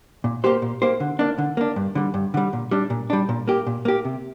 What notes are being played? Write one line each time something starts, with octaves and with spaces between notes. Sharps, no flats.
A#2
A#3 G4 C5
A#2
A#3 G4 C5
D3
A#3 D4
D3
A#3 D4
G2
D3 G3
G2
D3 G3
A#2
G3 D4
A#2
G3 D4
A#2
A#3 G4
A#2
A#3 G4
C3